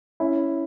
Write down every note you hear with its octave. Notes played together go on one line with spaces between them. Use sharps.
C#4 E4